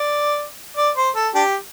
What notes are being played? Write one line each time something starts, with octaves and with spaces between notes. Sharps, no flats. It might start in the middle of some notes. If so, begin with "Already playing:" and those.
Already playing: D5
D5
C5
A4
D4 G4